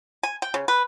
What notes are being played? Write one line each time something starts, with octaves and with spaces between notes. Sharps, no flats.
G#5
G5
C#3
B4